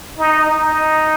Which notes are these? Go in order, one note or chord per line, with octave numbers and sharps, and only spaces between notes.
D#4
D#4